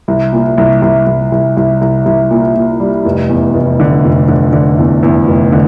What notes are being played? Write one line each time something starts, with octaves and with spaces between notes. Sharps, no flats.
C2
A#2
C2
C2
C2
C2
C2
C2
C2
A#2
A#2
G3
F1
E2
F1
D3
F1
D3
D3
E2
E2
F1
D3